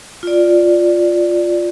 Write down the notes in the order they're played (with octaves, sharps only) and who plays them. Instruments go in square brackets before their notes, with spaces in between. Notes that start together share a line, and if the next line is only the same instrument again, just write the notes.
[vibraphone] F4 D5